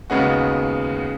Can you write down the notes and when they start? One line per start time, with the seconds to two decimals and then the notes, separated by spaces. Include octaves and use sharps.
0.10 D#2 C#3 G#3 B3 F#4